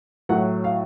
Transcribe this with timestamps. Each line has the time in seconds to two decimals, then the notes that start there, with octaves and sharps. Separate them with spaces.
0.29 A2 F#3 F#5
0.64 F5